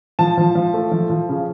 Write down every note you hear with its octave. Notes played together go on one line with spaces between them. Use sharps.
F3 A5
F3
F3
A3
F3
F3
C#3